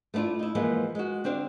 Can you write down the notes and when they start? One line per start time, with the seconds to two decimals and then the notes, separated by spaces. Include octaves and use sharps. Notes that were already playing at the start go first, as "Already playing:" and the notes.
0.14 A3 B3 D4 E4 F4
0.39 D#4 E4
0.55 E3 F3 G#3 A#3 B3
0.95 G#3 F#4
1.24 D3 C4 D4 C5 F5